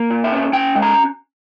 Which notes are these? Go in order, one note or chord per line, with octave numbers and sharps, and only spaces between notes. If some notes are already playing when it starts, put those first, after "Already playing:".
Already playing: A#3
A#2
E5
C#4
C#4 G5
G#3
A#5